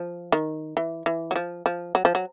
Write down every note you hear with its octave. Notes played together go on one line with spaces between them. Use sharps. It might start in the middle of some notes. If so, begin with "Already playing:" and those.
Already playing: F3
D#3
E3
E3
F#3
F3
F3
F#3
F3
F#3